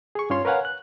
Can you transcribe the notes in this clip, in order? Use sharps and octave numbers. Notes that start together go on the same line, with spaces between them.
G#4 C#6
G2 C#4 F4 C#5 C6
A#4 B4 C#5 F5 F#5 G#5
F#6